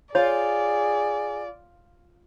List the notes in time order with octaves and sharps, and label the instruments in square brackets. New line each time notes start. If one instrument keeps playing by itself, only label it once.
[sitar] F4 [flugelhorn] G#4 [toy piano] C#5 [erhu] D5